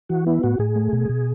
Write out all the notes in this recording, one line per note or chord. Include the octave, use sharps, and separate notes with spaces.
E3 F#4
B3 E4
A2 F#4
A2 G#4
A3
B2
B2